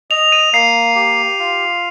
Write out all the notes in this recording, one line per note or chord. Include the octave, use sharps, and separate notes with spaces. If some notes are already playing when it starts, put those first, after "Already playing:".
D#5 F7
D#7
A#3 C7
G4
F4